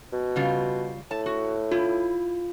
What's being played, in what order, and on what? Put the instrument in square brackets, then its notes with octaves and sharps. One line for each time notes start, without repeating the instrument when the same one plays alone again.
[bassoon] B2
[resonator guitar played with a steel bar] C#3 G3 F4
[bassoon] A2 [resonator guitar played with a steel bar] A5
[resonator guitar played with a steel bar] F#4
[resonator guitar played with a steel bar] E4 [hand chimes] F4